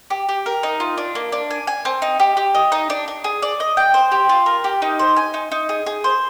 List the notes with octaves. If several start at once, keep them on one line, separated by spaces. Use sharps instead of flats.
G4
G4
A#4
D#4
F4
D4
A#3
D4
G#5
G#5
C4
D#4
G4
G4
D#5
D#4
D4
D4
G#4
D5
D#5
G5
C5
G4
F4
A#4
G4
D#4
C5
G#5
D#4
D#4
G#4
G#4
C5